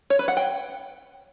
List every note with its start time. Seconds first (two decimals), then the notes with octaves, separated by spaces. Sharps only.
0.10 C#5
0.19 B4
0.28 F#5
0.37 G5